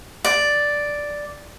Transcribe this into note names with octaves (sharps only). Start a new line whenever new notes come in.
D5